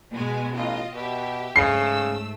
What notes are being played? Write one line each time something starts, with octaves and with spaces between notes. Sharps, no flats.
B2 G#3 G#5
A1 F4 D#5
B2 G4 E5
G#2 C#3 A3 E6 C7